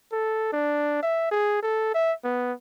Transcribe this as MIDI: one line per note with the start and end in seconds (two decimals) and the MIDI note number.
0.12 0.48 69
0.53 1.02 62
1.03 1.28 76
1.32 1.60 68
1.63 1.94 69
1.94 2.13 76
2.24 2.53 59